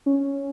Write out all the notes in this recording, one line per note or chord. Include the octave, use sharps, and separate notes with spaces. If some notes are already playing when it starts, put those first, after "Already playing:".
C#4